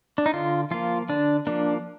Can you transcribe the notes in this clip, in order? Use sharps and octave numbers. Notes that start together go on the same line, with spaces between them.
D4
D#4
D3 F4
F3 A#3 F4
D3 D4
F3 A#3 D4